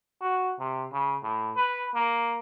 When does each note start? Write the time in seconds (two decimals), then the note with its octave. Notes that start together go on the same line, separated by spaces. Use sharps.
0.21 F#4
0.59 C3
0.92 C#3
1.23 A2
1.56 B4
1.95 A#3